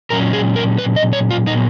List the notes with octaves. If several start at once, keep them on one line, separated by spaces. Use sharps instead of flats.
A#2 F#3 C#4 A#4
G#4
A#4
B4
D#5
C#5
F4
A#2 F#3 B3 D#4